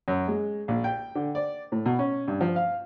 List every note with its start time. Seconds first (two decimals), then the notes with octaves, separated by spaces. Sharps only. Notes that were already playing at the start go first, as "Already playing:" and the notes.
0.08 F#2
0.28 G#3
0.68 A#1
0.84 G5
1.15 D3
1.35 D5
1.72 A2
1.86 B2
1.99 C#4
2.28 G2
2.41 F3
2.56 F5